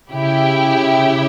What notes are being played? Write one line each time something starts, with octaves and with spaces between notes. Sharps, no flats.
C#3 E4 G4